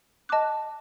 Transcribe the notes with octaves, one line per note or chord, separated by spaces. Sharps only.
D#5 A5 D6 F#6